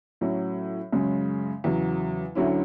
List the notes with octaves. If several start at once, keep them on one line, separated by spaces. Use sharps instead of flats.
A2 F#3 C#4
F#2 C#3 G#3 C#4
E2 C#3 F#3
D2 D3 F#3 C#4 E4